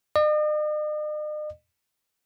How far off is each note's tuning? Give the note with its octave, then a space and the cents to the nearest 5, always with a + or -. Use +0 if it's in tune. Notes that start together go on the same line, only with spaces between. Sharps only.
D#5 -45